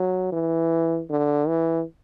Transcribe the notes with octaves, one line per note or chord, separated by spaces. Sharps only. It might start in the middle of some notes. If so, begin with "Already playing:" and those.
Already playing: F#3
E3
D3
E3